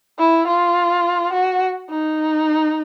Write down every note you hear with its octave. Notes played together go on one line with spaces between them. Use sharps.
E4
F4
F#4
D#4